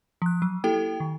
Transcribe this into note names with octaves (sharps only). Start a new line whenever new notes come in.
F3 F#6
F#3
A#3 E4 G4 A4 G5
D#3